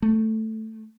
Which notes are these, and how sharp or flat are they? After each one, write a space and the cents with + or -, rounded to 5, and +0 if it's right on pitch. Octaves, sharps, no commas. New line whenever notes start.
A3 +5